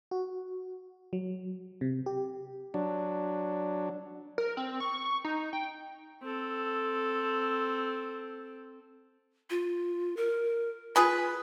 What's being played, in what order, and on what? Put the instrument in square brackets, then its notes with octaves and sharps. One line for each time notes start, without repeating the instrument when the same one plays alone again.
[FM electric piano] F#4
F#3
C3
G4
[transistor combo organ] F#3 D4
[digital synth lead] A#4
C4
C#6
D#4
G5
[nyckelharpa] C4 A4
[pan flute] F4
A#4
[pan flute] F4 [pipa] G#4 B4